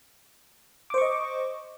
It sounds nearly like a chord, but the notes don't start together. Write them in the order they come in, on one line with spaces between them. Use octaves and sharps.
D6 C5 C#6 D#5